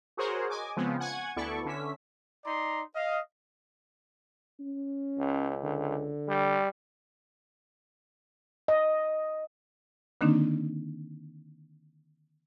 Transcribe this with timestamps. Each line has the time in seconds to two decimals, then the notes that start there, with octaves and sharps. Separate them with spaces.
0.17 F#4 G#4 A#4 C5 C#5 F#5
0.50 D#5 G#5 D6
0.76 C#3 F3 G#3 B3 C4
1.00 F#5 G#5 C#6 G#6
1.36 D2 B3 E4 A4 D5 C#6
1.65 D3 C#4 E5 B6
2.45 D#4 D5 A#5 C6
2.95 D#5 F5
4.60 C#4
5.18 C#2
5.64 D3
6.28 G3
8.68 D#5
10.21 D3 D#3 A#3 C4 D4 D#4